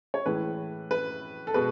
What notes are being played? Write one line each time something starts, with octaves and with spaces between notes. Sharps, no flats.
C#5
A2 E3 G#3 B4
B4
A4
B2 G#3 B4